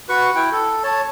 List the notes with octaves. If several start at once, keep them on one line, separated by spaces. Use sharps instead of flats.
F#4 B4 C#6
E4 G5
A4
C#5 A5